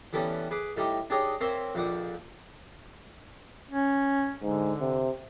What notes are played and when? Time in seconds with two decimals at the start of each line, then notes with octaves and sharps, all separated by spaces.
0.13 E3 G3 A3 B3 C#4
0.51 G#4 B4 D6
0.77 A2 G3 D#4 G4
1.10 D4 D#4 G4 G#4 C#5 D#5
1.41 A#3 C4 C5 C#5 E5
1.75 A#1 F2 D5 F#5
3.71 C#4
4.42 G#2 D3
4.80 C3